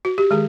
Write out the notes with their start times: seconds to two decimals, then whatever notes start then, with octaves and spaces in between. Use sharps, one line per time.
0.05 F#4
0.18 G4
0.31 D#3 G#3 G#4